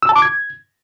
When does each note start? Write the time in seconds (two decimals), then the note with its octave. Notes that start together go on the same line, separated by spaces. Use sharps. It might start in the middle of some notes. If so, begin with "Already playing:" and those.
0.03 E6
0.09 A5
0.16 D6
0.22 G#6